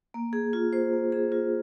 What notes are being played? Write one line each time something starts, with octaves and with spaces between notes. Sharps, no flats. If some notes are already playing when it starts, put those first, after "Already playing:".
A#3
G#4
F4
C5
A#3
G#4
F4